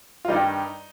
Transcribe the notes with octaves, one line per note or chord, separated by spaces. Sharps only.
F4
G2 D#3 G3 D#4